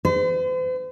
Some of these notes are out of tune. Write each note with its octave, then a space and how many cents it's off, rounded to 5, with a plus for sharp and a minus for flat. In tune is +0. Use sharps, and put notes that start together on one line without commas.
C5 -45